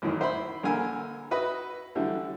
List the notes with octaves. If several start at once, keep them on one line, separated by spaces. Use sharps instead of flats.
A1 F#2 A2 D#3
C5 E5 B5
A#1 D3 A#3 A#4 G#5 E6
F#4 B4 D#5 E5 B5
D3 E3 F#3 G3 A3 E4